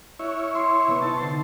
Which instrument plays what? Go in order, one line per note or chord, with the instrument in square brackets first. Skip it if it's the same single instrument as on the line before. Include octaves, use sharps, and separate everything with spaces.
[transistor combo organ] E4 C#5 [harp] D#5 F6 F#6
[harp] C6 D6
C3 B3
[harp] D#4 D#5 [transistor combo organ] A5
[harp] D3 C5 C7